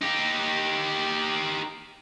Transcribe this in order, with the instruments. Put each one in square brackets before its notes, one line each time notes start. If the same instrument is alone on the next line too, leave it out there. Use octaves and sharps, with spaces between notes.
[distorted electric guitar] D#4 G4